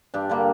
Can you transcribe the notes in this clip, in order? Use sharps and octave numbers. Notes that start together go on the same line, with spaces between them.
G2 D4
D3 G3 A#3